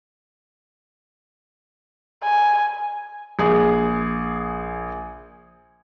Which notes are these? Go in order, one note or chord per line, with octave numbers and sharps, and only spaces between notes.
G#5
A#1 G#4